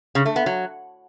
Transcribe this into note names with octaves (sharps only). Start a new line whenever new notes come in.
C#3
A3
B3
F#3